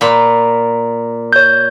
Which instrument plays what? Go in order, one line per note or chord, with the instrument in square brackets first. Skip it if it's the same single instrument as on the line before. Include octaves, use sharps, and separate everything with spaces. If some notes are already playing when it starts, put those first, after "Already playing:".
[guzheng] A#2 B5
[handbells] C#5 G6